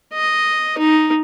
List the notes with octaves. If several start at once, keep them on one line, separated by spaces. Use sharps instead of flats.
D#5
D#4